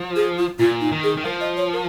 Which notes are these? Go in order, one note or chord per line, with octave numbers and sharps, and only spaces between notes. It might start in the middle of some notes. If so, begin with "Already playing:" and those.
Already playing: F3
G#4
F4
A#2 F4
D#4
D#3
G#4
D#3
F3 A#4
D#5
C#5
A#4